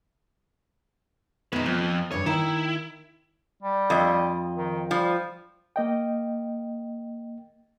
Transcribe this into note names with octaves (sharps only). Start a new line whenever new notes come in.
B2 G#3 D#4 B4
F2 F3
G2 C#3 D4 C#5
D#3 D#4 E4 G5
G3
F2 D#5
D#3
F3 G3
A#3 D#5 G5